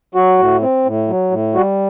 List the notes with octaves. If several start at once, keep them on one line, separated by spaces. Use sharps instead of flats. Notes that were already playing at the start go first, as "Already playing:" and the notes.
F#3 F#4
A2
C4
A2
F#3
A2
G3 F#4